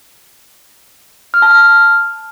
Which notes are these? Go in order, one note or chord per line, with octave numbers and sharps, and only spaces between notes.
F6
A5
F6